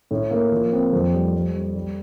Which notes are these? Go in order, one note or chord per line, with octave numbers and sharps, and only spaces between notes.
A2
A#3
F3
C4
F2
G3
G3
G3
G3